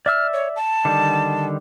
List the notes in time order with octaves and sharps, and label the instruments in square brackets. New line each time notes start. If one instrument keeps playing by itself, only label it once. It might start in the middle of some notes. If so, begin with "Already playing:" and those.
[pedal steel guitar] D5 E5 E6 [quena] F6
[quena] C#5
A5
[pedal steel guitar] D3 D#3 G3